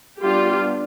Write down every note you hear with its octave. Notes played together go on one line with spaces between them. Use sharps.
G3 B3 D4 F4 G4